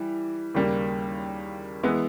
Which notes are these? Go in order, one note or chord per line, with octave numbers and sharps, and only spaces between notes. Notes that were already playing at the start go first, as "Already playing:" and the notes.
Already playing: E3 G3
D#2 C#3 G3 A#3
E3 G#3 B3 E4